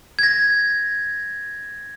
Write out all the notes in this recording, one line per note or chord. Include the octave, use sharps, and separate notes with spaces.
G#6
A#6